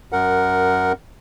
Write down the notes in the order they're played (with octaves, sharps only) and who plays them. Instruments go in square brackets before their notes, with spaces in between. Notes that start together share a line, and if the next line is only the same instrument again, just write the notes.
[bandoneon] F#2 A#4 F#5